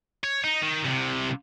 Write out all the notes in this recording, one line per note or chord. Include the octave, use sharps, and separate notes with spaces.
C#5
D#4
D#3
C2 C3